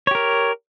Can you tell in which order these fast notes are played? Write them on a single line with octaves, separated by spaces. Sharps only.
C#5 G4 A#4